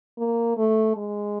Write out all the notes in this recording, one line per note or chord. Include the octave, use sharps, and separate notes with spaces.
A#3
A3
G#3